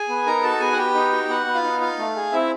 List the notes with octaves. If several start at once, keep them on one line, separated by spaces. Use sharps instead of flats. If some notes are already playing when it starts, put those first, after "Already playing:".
Already playing: G#4 G#5
B3
D#4 A#4 A#5
F#4 A4 A5
B3 G#4 G#5
F#5
B3 G4 G5
D#4
F#4
B3 F#4 F#5
B3
F4 F5
D#4
F4 F5
A3
G#4
C4 E4 E5